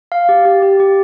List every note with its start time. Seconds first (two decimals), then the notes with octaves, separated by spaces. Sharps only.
0.12 F5
0.29 G4
0.45 G4
0.63 G4
0.80 G4